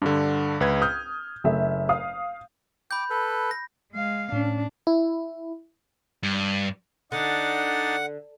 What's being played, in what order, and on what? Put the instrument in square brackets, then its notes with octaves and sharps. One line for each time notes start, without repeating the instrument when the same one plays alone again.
[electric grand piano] G2 D3 [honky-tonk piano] D4
[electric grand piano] C#2 B4 G#6
[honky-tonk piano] D#6 [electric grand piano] F6 G6
[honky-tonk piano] F#1 A3 E5
F5 D#6
[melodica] G5 D6 [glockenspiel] B5 G6
[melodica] A4 B4
[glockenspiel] A#6
[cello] G#3 F5
[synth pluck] A2 C#4 [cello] D4
[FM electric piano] E4
[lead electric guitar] G2
[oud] D3 [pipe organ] D4 D#4 A6 [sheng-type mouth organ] F#5